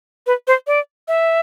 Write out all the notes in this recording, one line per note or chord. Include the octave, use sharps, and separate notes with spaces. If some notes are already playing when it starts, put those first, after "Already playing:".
B4
C5
D5
E5